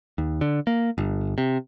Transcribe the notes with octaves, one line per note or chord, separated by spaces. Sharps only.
D#2
D3
A#3
G1
C3